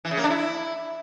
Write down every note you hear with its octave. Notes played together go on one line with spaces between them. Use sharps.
E3
C#3
A#3
D4
E4